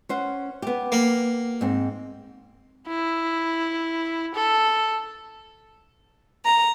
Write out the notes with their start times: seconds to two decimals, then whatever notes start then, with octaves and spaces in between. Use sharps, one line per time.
0.09 C#4 C5 F#5
0.62 B3 G4
0.92 A#3
1.61 G#2 C4
2.87 E4
4.35 A4
6.45 A#5